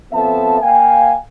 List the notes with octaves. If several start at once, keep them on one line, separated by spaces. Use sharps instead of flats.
F3 B3 C4 A4 E5 A5
A#3 F5 G5 G#5